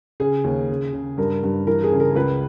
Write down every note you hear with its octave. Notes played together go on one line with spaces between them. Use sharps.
C#3 G#4
D#2
C#3
C#3
G2 A#4
G2
E3 A#4
G#4
C#3
A#4
C#2 B4